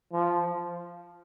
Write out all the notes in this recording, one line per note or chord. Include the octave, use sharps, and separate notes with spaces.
F3